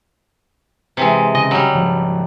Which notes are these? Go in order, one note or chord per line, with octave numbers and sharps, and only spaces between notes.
C3 E3 G#3
C#3 D#5
F#3 G3
G#1 C#3 F3